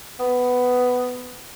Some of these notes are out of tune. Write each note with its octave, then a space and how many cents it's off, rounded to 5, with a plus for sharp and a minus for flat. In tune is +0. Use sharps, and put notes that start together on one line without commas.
B3 +10